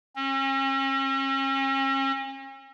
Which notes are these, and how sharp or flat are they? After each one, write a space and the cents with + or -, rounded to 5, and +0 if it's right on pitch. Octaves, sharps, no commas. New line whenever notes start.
C#4 -40